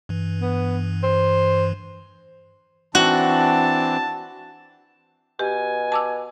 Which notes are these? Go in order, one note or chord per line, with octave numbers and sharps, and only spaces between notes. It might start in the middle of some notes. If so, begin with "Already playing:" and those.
G2 E3
B3
C5
E3 C4 D4 F#4 A5
B2 G4 G#5
A5 D6 E6